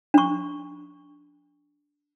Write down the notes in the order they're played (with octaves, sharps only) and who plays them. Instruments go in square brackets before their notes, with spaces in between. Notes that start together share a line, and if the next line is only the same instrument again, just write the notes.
[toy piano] D4 C#6